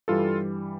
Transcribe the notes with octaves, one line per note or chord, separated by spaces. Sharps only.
G2 E3 G3 F4 A4